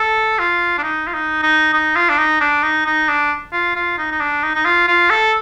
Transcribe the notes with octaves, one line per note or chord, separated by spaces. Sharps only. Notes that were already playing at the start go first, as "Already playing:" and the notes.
Already playing: A4
F4
D4
D#4
F4
D#4
D#4
D#4
F4
D4
D#4
D4
D#4
D#4
D4
F4
F4
D#4
D#4
D4
D#4
D#4
F4
F4
A4